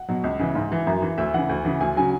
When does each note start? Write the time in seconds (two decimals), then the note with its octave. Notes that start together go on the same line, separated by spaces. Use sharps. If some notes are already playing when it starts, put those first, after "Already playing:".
Already playing: F#5
0.08 B2 F#3
0.24 C#2
0.39 C#3 E3
0.55 G#2
0.72 E3
0.87 F#2
1.02 E3
1.18 D2 E5
1.34 C#3 E3 F#5
1.49 D2
1.65 C#3 E3
1.80 D2 G#5
1.96 C#3 F#3 G#5